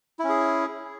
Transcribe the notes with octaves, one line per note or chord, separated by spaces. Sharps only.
C#4 E4 G#4